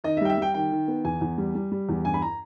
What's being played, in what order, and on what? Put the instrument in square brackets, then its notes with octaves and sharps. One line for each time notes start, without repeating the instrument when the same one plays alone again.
[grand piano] D#3 D#5
E5
G3 G5
E5
G3 G5
D#3 G5
D#3
B3
E2 G#5
E2
G3
G3
G3
E2
G2 G#5
B5
A#5